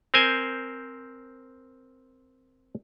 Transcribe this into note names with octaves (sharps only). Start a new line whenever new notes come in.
C4 A#4 C5 G#5